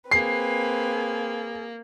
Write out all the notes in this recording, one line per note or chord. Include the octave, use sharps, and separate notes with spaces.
A#3 C4 G#4 B4 C7